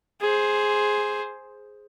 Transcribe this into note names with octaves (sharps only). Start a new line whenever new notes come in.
G#4 C5